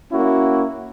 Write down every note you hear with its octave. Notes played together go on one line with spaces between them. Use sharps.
A#3 C#4 E4 F#4